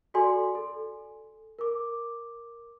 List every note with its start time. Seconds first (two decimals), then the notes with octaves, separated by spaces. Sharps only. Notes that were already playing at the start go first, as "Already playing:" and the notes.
0.14 F#4 A4 D5 G#5 C6
0.55 A4
1.59 A#4 D6